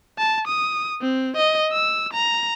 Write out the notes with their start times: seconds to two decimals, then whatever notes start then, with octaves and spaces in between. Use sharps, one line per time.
0.19 A5
0.48 D#6
1.02 C4
1.37 D#5
1.72 E6
2.13 A#5